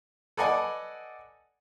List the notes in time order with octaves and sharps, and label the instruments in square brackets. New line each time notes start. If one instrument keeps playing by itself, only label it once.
[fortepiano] A4 B4 D5 D#5 F#5 G#5